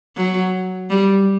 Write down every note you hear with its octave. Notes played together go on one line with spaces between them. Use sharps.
F#3
G3